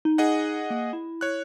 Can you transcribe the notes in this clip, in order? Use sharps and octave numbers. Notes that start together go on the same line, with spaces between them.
D#4
G#4 D#5 F#5
A#3
E4
C#5 F#6